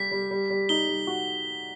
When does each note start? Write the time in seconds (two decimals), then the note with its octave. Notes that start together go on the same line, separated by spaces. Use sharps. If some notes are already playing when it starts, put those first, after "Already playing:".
Already playing: G3 G4 B6
0.11 G3
0.31 G3
0.50 G3
0.69 D#4 G7
0.89 G3
1.07 F#4